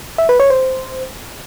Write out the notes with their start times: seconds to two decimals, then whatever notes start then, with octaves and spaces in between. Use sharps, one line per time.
0.18 E5
0.29 B4
0.40 C#5
0.50 C5